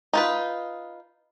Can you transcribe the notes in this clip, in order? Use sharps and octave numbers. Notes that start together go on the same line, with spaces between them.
D#4 F4 B4